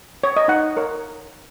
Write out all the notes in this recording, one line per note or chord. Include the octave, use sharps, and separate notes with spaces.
C#5
D#5
D#4 F#5
A#4 C#5